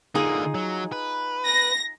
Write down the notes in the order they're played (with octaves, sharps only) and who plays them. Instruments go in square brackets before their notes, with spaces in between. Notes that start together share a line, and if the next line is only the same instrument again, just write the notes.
[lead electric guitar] D3 A#3 [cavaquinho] D#4 F4 G#4
[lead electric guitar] F#3
B4
[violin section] A#6